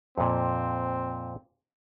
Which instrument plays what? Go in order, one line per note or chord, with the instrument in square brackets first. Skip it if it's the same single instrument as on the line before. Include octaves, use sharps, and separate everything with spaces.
[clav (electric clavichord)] F2 A#2 [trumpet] C4